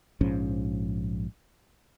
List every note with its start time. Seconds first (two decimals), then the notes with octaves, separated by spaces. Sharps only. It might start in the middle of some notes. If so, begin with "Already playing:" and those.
0.21 A#1 G#2 F3 C#4